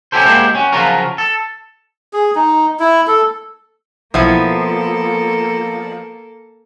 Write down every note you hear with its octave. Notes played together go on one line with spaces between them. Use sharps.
C#4 E4 F#4 G4 A4 C5
G#3 A#3 E4 F#4 G4 C5
C#4 F#4
C#3 F3 F#3 F4 F#4 A#4
A4
G#4
D#4
E4
A4
B1 F3 A#3 B3 E4 A4 G#6